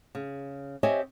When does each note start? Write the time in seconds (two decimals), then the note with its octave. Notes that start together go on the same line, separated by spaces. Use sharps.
0.15 C#3
0.83 C4 G4 C#5 D#5 E5 G#5